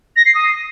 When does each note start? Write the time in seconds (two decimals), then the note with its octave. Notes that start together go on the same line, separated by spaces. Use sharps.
0.16 A#6
0.25 C7
0.34 D#6